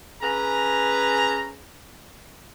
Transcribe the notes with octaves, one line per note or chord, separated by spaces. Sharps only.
C#4 G#4 B4 A#5